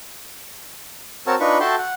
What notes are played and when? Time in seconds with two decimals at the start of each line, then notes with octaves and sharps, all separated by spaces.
1.27 C4 F#4 A#4 C#5 A5 E6
1.40 D4 D#4 F4 B4 B5 C#6
1.60 F#4 A4 E5 G5 A5 C6
1.78 F#5